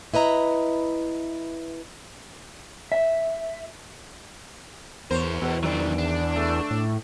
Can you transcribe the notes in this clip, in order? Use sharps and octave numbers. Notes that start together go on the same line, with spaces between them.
E4 B4 D#5 A#5
E5
E2 A#4 C5 C#5
E2 B2
D#3 F#3 D4
D4
A3
A2